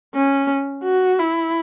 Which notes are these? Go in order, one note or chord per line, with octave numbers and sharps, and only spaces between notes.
C#4
F#4
E4